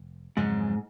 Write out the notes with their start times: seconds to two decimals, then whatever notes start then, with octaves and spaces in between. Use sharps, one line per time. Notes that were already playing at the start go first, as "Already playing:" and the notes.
Already playing: F1
0.37 F2 G#2 C#3 F#3